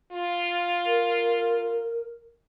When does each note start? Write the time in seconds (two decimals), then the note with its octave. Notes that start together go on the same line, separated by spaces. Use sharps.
0.12 F4
0.86 A#4